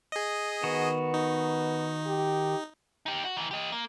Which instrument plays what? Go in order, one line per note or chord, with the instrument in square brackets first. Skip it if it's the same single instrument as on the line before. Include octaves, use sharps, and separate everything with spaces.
[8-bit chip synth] G#4 D#5
[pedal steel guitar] D#3 F#4 [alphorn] B3
[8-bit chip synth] D#4
[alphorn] G4
[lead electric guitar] D#4 G4
F#4
D#3 E3
G4 D#5
A#3